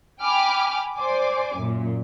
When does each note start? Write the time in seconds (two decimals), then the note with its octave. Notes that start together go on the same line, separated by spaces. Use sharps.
0.23 G5 G#5 B5 D6 F6
0.95 C5 D5 G#5 D6
1.57 F#2 A#2